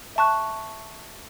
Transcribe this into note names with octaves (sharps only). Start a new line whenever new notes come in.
E5 A5 C#6 F#6